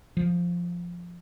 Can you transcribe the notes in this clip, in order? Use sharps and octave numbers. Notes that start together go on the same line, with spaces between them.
F3